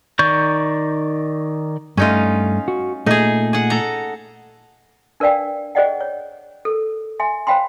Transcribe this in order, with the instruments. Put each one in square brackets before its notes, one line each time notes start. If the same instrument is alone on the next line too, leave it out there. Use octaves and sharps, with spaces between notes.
[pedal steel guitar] D#3 D5 C#6 G6
[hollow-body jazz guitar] G2 A3 [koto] C#4 D#4 F4
[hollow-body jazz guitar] F#4
[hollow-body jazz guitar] A#2 A3 [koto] D#4 G#4
[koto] G#4 F#5
A4 A#5
[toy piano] D4 A#4 B4 D5 F5 G5
G#4 C5 D5 D#5 F#5 G5
C#5
A4 A#4
E5 G#5 C6
C5 C#5 F5 G5 B5 C6